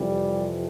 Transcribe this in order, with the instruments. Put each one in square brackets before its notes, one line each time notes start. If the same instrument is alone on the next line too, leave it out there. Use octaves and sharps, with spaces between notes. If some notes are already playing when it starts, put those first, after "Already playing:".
Already playing: [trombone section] F2 C3 E3 G3